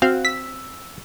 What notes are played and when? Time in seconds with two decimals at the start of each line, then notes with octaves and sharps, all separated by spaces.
0.02 C4 F#4 F5
0.25 E6 B6